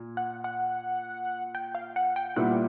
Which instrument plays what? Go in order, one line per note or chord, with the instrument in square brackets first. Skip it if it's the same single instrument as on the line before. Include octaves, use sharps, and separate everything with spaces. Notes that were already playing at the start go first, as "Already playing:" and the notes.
Already playing: [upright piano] A#2
[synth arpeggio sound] F#5
F#5
G5
F5
F#5
G5
[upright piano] A#2 G3 B3 E4 [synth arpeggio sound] F#5